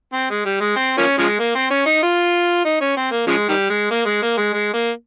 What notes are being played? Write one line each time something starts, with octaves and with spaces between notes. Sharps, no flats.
C4
G#3
G3
G#3
C4
F3 A#3 C#4
C#3 F3 G#3
A#3
C4
C#4
D#4
F4
D#4
C#4
C4
A#3
C#3 F3 G#3
D#3 G3
G#3
A#3
G#3
A#3
G#3
G#3
A#3